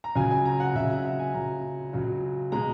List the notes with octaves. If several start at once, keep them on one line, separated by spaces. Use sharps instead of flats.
A#5
C#2 C#3 F#3 G#5
G#5
A#5
F#5
C#2 C#3 F#3 E5
E5
F#5
G#5
C#2 C#3 F#3 A#5
C#2 C#3 F#3
B2 G#3 A#5